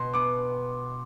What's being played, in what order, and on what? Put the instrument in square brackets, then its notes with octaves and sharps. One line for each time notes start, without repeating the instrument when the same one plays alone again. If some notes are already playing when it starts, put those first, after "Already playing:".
Already playing: [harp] B2 [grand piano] C6
[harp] B3 [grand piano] D6